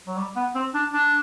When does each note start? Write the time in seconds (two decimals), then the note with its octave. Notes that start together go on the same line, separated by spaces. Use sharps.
0.07 F#3
0.17 G3
0.36 B3
0.55 C4
0.74 D4
0.93 D4